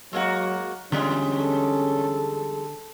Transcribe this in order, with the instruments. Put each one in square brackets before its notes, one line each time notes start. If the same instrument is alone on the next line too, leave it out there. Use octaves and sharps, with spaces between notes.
[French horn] F#3 [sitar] G#3 A#3 F#4
[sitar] E2 G3 G#3 [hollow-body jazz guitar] D3 [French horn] C#4
[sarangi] A4